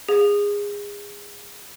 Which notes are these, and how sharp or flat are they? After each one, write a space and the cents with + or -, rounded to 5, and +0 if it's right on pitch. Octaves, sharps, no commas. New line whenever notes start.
G#4 -25